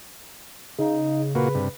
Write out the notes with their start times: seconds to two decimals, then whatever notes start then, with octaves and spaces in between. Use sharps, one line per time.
0.79 C#3 D#4
1.35 A#2 A#3 F#4 B4
1.55 G2 C3